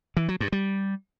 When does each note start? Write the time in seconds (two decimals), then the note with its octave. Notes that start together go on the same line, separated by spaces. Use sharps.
0.17 E3
0.29 F#3
0.40 G2
0.52 G3